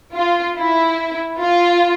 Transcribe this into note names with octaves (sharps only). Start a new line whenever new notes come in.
F4
E4
F4